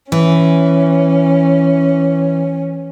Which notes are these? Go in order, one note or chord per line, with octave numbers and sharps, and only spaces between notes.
E3 C#4